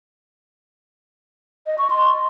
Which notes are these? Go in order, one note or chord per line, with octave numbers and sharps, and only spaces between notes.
D#5
C#6
C6